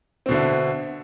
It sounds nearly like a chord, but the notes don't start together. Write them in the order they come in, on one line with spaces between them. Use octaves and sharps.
C4 B2 D3 E4